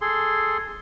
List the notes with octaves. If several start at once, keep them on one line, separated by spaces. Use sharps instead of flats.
G#4 A4 C6